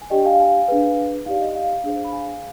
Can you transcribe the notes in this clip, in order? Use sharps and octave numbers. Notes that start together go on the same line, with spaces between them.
G#5
D4 G4 D5 D#5 G5
F5 G#5
F5 G#5
D4 G#4 B4
D#4 G4 D5 F5
D#5
F5
D4 G#4 C5
B5
F5 G#5